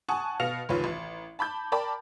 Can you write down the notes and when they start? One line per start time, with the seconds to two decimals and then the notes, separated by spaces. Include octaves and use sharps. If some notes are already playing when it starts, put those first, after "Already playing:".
0.08 F#5 G#5 A5 C#6 D#6 F#6
0.40 B2 F5 F6 A#6 C#7 F7
0.69 F1 C#2 D#3 F4 B4 C#5
0.84 A1
1.39 A5 B5 D6 G6
1.72 A#4 D5 G5 A5 B5 D6